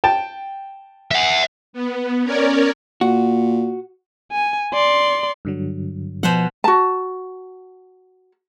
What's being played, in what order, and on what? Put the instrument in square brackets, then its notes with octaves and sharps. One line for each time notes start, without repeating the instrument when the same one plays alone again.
[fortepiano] G5 A5
[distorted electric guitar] E5 F#5
[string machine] B3
C#4 A#4 C#5 D5
[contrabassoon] A#2 [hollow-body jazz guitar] F#4
[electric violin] G#5
D5 C6
[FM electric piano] G2 D3 F#3
[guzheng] B2 C5 F#5 [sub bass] F3
[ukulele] F#4 A5